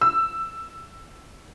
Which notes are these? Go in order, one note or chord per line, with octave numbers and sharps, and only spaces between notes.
E6